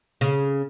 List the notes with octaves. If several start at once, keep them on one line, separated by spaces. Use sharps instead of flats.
C#3